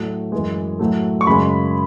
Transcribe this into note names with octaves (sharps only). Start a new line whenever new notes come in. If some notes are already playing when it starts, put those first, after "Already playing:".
Already playing: A2 F#3 A3
F#2 E3 G#3
A2 F#3 A3
C#6
F#2 C#3 G#3 B5